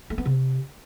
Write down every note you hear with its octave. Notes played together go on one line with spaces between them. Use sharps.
A3
B3
C3